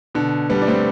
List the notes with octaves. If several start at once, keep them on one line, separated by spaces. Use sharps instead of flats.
B2 D3
G3 B3
D4
A3 C4